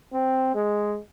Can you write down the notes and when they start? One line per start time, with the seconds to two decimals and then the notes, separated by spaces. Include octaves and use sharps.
0.14 C4
0.54 G#3